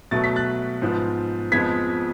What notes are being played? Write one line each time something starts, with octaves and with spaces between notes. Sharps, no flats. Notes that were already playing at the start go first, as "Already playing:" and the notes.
B2 F#3 A3 A6
B6
F#6 A6
G#2 F3 B3
F2 F3 G#3 B3 G#6 B6